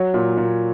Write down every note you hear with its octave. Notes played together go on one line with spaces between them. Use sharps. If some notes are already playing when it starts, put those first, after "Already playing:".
Already playing: F#3 C#5
A#2
A#2